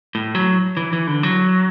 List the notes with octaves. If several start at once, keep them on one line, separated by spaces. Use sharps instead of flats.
A2
F#3
E3
E3
D3
F#3